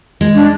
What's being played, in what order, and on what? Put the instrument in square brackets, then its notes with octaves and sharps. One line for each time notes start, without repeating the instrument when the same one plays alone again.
[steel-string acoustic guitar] G#3
[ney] D4